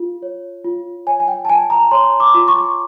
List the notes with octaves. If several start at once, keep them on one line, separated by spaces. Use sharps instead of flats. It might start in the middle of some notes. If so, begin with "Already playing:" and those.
Already playing: F4
C#5
F4
C#5 G#5
G#5
G5
A5
F4 G#5
A#5
C#5 C6
D6
F4
C#6